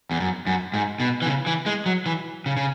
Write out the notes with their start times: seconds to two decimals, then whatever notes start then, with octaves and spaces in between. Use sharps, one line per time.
0.11 E2
0.20 F#2
0.46 F#2
0.74 G#2
1.00 B2
1.22 E3
1.26 C#3
1.46 E3
1.66 G#3
1.86 F#3
2.06 E3
2.46 C#3
2.57 C#3